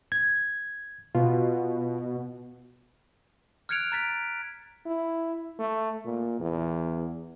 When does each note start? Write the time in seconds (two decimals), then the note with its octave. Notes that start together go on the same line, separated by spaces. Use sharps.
0.12 G#6
1.15 B2 F4
3.69 F6 F#6 G#6 C#7 D7 F7
3.92 A#5 A6 B6 D7
4.86 E4
5.59 A3
6.05 A#2
6.40 E2